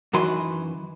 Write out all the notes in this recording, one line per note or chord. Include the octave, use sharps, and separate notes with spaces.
F#2 D#3 E3 F#4 B4 C6